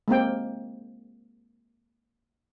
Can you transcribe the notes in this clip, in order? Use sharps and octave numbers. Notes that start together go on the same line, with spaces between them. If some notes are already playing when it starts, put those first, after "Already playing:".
G#3 A#3 C4 G5